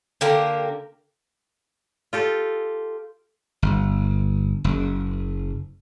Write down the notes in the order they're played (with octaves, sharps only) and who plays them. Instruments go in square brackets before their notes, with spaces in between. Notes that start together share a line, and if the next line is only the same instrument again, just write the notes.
[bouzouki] D3 A#3 G4 A#4
[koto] F4 G4 A4
[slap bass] G1
F#1